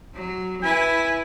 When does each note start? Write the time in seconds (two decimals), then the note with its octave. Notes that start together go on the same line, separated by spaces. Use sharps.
0.15 F#3
0.62 E4 B4 G#5